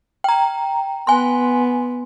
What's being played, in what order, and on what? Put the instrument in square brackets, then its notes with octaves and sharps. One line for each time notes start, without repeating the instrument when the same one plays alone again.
[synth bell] G5 A#5
[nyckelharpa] B3 [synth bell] G#5 C6